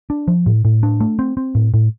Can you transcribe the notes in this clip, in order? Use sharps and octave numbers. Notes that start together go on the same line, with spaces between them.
D4
F3
A2
A2
D4
A3
C4
C4
A2
A2